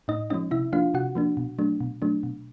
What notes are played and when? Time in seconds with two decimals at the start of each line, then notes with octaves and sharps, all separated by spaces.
0.08 A2 D#4 D#5
0.30 F3 G#3 C#4 D#4 D#5
0.51 C3 E4 E5
0.73 F3 A#3 D4 F4 F5
0.94 C3 F#4 F#5
1.15 F3 A#3 D4
1.37 B2
1.59 F#3 A3 D4
1.81 B2
2.02 F#3 A3 D4
2.23 B2